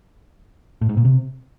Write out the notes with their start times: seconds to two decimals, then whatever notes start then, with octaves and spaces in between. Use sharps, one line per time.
0.81 A2
0.89 G#2
0.97 A#2
1.05 C3